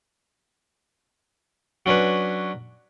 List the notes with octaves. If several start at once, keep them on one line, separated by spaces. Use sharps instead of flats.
F#3 C#4 D4 B4 C#5